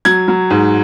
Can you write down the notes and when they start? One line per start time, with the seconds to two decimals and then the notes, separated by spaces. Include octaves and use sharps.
0.05 F#3 G#6
0.28 F#3
0.50 G#2